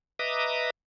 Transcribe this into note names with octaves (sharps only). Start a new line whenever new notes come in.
B4 D#5 E5 A#5 D6 D#6